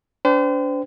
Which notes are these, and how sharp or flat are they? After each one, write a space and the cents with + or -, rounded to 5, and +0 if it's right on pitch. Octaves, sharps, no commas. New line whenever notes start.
D4 -35 C5 -40 G5 +0